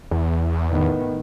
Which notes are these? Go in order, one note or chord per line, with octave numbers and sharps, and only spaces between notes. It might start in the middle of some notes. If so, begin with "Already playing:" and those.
E2
A2 D#3 B3